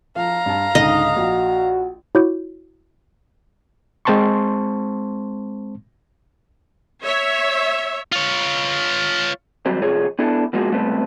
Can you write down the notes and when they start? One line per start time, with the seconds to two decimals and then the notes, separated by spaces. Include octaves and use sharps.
0.16 F3 F5 A#5
0.46 G2 A5
0.75 C#2 G#2 D3 D#4 D#5
1.16 A#1 F#4
2.15 E4 F#4 C#5 D6 G6
4.05 G#3 C4 C5 A5 C6 C#6
7.03 C#5 E5
8.12 F4 C#5
9.66 D#2 F#3 G3 C4
9.81 F2 C3 F4 G#4 C#5
10.19 B3 D4 E4 A4
10.53 B2 F3 G#3 A#3 F#4
10.72 C#2 C3 G3 A3 B3 C4